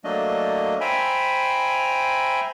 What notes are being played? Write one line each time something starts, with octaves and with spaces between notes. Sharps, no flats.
F#3 A3 A#3 D4 D#5
C5 E5 G5 G#5 A#5 B5